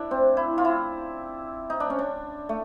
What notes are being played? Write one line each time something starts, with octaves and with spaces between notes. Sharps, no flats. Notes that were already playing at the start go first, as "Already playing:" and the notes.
Already playing: D4 E4
C4
E4
F4
E4
D#4
D4
C#4
D4
A3